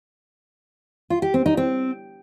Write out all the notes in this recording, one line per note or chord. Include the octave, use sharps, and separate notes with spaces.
F4
G4
C4
D#4
C4